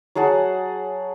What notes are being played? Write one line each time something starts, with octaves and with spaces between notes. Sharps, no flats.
F#3 G#4 F#5 A5